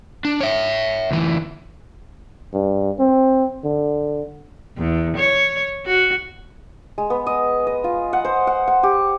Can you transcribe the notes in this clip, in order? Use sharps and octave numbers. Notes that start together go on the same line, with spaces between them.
D4
C#5 E5
D2 E3
G2
C4
D3
E2
C#5
F#4
G#3
B3
D#5
D#5
F4
F#5
C5
F#5
F#5
G4